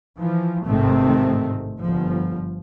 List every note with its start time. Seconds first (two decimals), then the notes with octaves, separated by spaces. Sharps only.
0.18 E3 F3
0.66 A1 G#2 C3 D#3 A3 C4
1.80 G1 F3